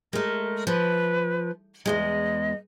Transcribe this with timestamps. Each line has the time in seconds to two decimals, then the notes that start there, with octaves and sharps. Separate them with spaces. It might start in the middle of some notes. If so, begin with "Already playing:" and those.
0.13 G#3 A3 A#4
0.67 F3 B4
1.86 E2 G#2 G#3 D#5